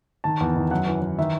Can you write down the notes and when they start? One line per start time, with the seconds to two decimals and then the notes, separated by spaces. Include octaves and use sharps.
0.24 D#3 A5
0.41 E2
0.56 D#3
0.71 F#2 F#5
0.87 E3
1.02 E3
1.19 D#3 E5